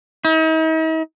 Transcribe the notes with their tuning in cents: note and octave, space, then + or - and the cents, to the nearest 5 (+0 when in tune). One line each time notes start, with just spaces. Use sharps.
D#4 +45